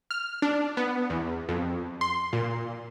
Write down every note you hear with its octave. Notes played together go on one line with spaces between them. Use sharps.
F6
D4
B3
E2
F2
C6
A#2